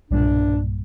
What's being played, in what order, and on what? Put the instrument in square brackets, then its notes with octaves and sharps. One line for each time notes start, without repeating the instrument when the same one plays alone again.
[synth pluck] B1 G2 A#2 [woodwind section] D4